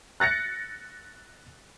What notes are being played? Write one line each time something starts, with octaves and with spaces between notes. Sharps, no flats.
F#6 A6 A#6 C#7